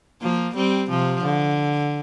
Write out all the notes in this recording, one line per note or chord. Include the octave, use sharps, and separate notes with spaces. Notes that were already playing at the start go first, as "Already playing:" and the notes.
F3 A#3
G3 C4
C3 F3
D3